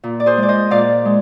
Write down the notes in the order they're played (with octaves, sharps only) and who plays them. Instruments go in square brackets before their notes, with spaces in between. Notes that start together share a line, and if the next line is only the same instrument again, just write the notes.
[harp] A#2
D5
G#4 C5
G#3
D5
C5 D#5
A#2 D5 F5
G#3